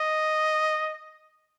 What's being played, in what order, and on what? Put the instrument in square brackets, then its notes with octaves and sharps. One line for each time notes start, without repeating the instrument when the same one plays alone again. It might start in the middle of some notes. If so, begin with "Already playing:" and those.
Already playing: [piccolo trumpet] D#5